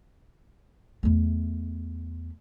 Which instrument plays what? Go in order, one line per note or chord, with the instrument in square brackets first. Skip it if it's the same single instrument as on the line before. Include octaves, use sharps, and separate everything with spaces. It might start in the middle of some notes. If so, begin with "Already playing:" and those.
[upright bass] E2 A3